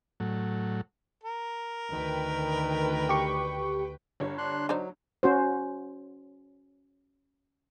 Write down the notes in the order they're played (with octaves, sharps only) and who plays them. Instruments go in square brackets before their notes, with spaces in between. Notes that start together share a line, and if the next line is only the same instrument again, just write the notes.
[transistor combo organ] A2 F#3
[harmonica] A#4
[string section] D2 B4 G5 [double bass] D#3
[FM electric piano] G4 C#6
[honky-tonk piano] G1 G2 C#5
[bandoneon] D4 C6 F#6
[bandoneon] F#3 [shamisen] D4 D#4 C5
[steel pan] C#4 F#4 C5